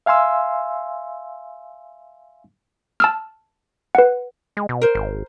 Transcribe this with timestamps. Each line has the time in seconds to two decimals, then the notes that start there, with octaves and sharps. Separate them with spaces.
0.06 E5 F5 G#5 C6 E6
3.00 A5 E6 F6
3.95 B4 F#5
4.57 G#3
4.69 B2
4.82 A#4 C5
4.95 G#1